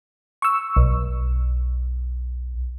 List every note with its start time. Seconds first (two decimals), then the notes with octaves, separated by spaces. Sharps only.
0.42 C#6 E6
0.76 B1